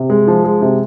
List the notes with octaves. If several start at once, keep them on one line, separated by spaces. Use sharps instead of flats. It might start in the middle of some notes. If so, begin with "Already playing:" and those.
Already playing: C3
G#3
F3
G#3
C3